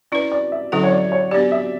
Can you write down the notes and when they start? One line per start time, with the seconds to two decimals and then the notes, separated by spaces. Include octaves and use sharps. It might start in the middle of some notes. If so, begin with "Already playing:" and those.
0.12 C#4 E4 B4 D5
0.32 D5
0.52 E5
0.72 D3 F#3 C#4 E4 A4 F#5
0.83 C#5
0.92 D5
1.12 C#5
1.31 B3 D4 G4 D5
1.52 E5